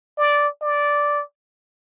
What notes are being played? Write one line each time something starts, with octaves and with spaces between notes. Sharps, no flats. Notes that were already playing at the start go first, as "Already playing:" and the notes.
D5
D5